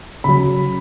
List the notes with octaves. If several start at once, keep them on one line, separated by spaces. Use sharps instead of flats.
C#3 F#3 B5